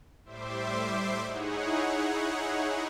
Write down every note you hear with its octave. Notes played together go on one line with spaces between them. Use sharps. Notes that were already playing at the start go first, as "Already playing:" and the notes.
A2 G3 C5 E5 C6 D6
D#4 E4 G#4 C#5 F#5